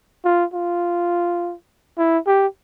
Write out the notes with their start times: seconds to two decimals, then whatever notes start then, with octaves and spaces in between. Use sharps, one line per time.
0.25 F4
0.53 F4
1.98 E4
2.27 G4